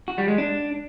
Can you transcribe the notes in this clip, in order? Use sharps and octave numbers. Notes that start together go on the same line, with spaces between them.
F#4
G3
G#3
D4